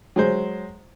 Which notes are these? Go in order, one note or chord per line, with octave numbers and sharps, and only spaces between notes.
F#3 G#3 C5